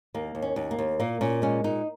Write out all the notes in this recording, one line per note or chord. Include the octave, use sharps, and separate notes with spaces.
D#2 A#3
D#2
C#4
D#2
A#3
D#2
A#2 A#3
A#2 C#4
G#3 C#4
A#2 D#4